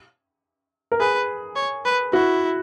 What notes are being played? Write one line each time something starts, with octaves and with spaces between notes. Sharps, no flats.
A#4
G#4 B4
C#5
B4
E4 F#4